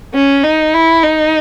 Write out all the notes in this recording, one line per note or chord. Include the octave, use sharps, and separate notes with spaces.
C#4
D#4
E4
D#4